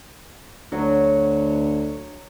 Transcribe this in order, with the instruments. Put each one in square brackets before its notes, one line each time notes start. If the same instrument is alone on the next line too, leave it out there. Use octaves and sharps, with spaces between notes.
[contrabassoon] D2 [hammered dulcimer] F#3